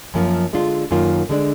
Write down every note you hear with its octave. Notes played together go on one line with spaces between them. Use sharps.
F#2 F3 A#3
D3 G#3 D4 F4
F#2 D#3 A#3 F4
D3 G#3 D4